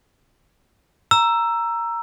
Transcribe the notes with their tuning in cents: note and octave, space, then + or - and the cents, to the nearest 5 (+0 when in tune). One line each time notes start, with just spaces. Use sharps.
A#5 +0 E6 +15